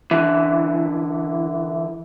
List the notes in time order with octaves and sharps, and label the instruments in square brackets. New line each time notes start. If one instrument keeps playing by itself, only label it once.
[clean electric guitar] D3 E3